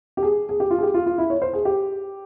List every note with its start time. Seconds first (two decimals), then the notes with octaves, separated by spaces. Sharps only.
0.17 G4
0.23 G#4
0.49 G#4
0.60 G4
0.70 F4
0.79 G#4
0.83 G4
0.94 F4
1.06 F4
1.18 E4
1.30 C#5
1.42 C5
1.53 G#4
1.65 G4